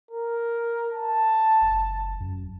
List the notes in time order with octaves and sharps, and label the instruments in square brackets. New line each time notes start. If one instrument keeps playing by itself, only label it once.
[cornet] A#4
A5
[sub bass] F#1
F#2